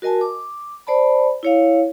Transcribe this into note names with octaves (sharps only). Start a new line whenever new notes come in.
F#4 A#4 D#5 G#5 A5
D6
C5 D5 A5 B5
E4 C#5 F5